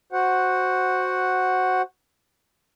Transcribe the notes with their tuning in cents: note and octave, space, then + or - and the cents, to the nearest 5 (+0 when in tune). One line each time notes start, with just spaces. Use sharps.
F#4 +0 C5 +0 F#5 +0